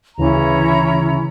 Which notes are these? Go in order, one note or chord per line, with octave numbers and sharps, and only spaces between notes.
D2 C#3 E3 C#4 E4 A#5